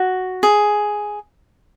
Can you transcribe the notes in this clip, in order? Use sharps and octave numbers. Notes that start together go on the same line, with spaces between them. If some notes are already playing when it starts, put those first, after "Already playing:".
Already playing: F#4
G#4